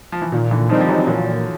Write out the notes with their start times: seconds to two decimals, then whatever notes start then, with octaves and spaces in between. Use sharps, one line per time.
0.12 F3
0.22 E3
0.32 A#2 D#3
0.51 D3 E3
0.69 D#3 F3 G3 C4 D#4
0.81 F3
0.89 E3 F#3
1.07 A#2 E3 F#3